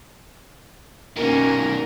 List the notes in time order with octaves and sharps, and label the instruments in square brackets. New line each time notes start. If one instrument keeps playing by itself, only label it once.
[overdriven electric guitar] B2 D#3 [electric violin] A#3 C#4 [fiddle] A#4